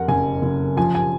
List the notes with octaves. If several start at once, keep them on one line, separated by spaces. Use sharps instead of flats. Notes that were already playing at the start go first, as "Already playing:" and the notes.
Already playing: F2 A#4 F#5
F#1 G#5
F#1
F3 G#5
G#5